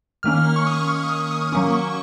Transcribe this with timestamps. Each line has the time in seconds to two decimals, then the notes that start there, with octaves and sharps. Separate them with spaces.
0.23 D#3 A#3 C#4 F6
0.56 C#6
0.67 D#6
0.87 C#6
1.09 D#6
1.31 D#6
1.52 F#3 A#3 C#4 C#6
1.74 C#6